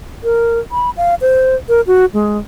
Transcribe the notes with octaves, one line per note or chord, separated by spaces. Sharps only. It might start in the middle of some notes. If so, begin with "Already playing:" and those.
A#4
B5
F5
C5
A#4
F#4
G#3